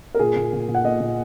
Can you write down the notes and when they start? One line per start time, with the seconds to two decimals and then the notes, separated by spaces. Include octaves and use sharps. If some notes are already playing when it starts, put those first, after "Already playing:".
0.14 A#4
0.19 A#2 G#4
0.36 A#2
0.53 A#2
0.68 A#2
0.75 F#5
0.84 A#3 D#5
1.00 A#2